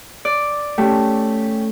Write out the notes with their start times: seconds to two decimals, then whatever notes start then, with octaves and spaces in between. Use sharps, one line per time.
0.25 D5
0.78 A3 C#4 G4